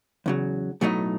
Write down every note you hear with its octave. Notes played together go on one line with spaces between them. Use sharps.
E2 C#3 F#3
B1 A2 F#3 A3 D#4